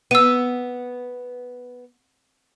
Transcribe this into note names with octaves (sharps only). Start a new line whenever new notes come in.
B3 E6 D#7